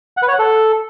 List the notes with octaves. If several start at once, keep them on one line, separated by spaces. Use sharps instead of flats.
F#5
B4
C#5
F#5
A4